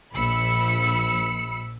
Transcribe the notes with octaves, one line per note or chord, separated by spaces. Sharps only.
A#1 B5 E6 C#7